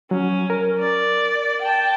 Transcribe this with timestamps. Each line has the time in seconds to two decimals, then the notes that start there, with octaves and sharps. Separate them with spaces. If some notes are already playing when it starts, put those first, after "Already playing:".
0.11 F#3 C#4
0.50 A#4
0.80 D5
1.62 G5 A5